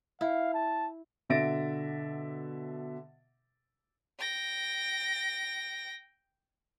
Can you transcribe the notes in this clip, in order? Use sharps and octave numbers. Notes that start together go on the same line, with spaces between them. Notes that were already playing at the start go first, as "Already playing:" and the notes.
E4 F5
A5
B2 D3 E5 A6 A#6 D7
G5 A#6